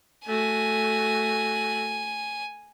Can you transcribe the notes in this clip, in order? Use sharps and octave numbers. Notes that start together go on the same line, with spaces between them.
A3 F#4 G#5